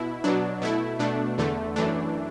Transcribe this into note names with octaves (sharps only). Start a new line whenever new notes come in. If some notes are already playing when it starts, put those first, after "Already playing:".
Already playing: B2 E4
B2 F#3 D4
B2 A3 E4
B2 A3 D4
E2 D3 A3
F#2 E3 A3 D4